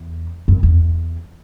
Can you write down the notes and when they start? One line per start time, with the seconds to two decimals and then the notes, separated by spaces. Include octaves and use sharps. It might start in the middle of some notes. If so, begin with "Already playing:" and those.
Already playing: E2
0.48 F#2
0.63 E2